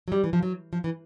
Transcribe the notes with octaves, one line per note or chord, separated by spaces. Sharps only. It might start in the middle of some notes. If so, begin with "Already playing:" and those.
F#3
G3
E3
F3
F#3
F3
E3